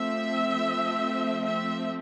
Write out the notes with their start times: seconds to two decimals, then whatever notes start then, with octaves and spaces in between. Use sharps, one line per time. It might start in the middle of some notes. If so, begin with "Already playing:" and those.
Already playing: F3 A3 C4 E5
1.46 E5